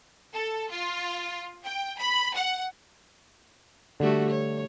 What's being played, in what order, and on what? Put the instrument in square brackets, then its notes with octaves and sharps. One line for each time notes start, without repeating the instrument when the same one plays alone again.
[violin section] A4
F4
G5
B5
F#5
[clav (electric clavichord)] D3 [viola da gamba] G3 A3 F#4
[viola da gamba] C#5